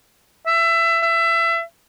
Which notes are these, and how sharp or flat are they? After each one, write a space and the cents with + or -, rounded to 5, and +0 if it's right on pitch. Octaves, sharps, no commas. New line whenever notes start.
E5 +20
E5 +25